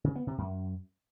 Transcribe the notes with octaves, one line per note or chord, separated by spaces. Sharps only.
C#3
B3
C3
F#2